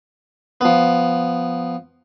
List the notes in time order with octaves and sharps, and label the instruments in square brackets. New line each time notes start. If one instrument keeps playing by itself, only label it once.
[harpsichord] F3 B3